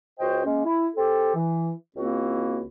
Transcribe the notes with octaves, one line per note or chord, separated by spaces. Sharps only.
C#2 F#4 C5 D#5 G5
G#3 A#3 C#4
E4
C4 G4 A4
E3
C#2 A#3 C4 E4 F#4